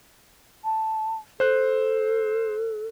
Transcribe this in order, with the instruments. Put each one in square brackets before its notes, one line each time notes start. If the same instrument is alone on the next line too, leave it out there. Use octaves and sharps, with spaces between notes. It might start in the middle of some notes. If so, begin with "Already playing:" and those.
[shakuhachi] A5
[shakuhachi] A4 [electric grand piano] C5 F#6